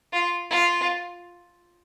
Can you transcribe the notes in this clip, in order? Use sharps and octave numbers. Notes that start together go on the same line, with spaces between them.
F4
F4